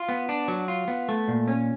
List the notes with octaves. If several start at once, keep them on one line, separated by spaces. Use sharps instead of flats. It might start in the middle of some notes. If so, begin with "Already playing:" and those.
Already playing: F4
B3
D4
F#3
F4
B3
A3
A#2
C#4